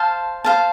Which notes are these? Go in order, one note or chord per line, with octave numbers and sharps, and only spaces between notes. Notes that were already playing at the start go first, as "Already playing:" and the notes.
Already playing: C5 F5 A5
C5 F5 A5